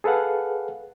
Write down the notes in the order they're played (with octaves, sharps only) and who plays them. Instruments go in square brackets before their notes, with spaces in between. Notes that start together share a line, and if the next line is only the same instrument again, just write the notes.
[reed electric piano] G#4 A4 B4 F5 F#5